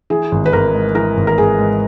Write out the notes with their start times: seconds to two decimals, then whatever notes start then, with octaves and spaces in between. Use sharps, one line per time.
0.10 E3 G#4
0.32 G#1
0.46 B4
0.53 G#1 A#4
0.74 G#2
0.95 E3 A#4
1.17 G#1
1.27 A#4
1.38 G#1 G#4
1.59 G#2